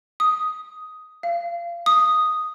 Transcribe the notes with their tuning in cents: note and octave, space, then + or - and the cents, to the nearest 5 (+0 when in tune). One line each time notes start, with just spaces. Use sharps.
D#6 +10
F5 -25
D#6 +0